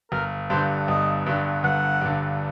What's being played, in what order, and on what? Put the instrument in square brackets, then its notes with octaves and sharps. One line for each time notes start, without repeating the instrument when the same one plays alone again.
[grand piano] G1 [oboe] A#4
[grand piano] G2 D3 [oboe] C5
[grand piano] G1 [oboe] D#5
[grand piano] G2 D3
[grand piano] G1 [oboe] F#5
[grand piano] G2 D3